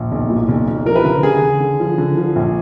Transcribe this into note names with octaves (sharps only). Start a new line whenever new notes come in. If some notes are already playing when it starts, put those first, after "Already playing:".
Already playing: A#1
B1
A#2
B1
B1
F3 A#4
B4
D3 A#4
D3 G#4
D3
D3
F3
D3
F3
A#1